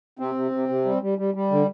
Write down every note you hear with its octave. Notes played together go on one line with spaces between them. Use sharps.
C3 C4
C3
C3
C3
G3
G3
G3
G3
D3